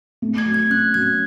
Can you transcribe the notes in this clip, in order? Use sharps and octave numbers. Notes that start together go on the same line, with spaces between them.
A3
G#6
F#3
G#6
C#4 F#6
F#3 G#6